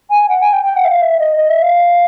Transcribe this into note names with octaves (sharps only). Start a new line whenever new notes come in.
G#5
F#5
G#5
G5
G5
F#5
E5
F5
E5
D#5
D#5
E5
F5